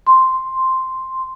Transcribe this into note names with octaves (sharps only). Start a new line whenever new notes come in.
C6